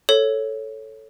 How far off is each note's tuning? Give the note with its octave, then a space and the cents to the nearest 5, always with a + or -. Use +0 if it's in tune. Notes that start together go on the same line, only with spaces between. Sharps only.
A4 +0 C#5 -5